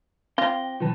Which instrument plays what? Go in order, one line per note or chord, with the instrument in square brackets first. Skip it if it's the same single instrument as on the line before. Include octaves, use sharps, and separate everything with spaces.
[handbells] C4 A#6 [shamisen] F4 [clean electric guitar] G5
[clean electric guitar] B1 E3 [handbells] F4 B4 A5